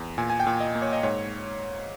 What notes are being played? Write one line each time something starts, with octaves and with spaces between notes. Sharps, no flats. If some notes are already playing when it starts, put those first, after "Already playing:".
Already playing: E2
A#2 G#5
G#5
G5
A#2
D#5
A#3
C#5
D#5
G#2 C#5